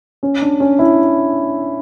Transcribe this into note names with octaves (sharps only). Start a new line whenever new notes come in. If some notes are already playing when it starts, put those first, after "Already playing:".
C#4
D4
C#4
E4